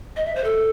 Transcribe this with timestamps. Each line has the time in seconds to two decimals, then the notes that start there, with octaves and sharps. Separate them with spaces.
0.17 D#5
0.26 E5
0.35 C5
0.44 A4